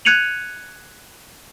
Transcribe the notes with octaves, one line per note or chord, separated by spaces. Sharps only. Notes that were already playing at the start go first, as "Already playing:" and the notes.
F#6 G#6 C#7 D#7 F7 F#7